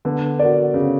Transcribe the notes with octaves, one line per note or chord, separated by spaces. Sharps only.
D3 B3
F#4 A#4 D5
C#3 B3